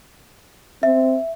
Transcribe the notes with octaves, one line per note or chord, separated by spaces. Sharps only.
C4 E5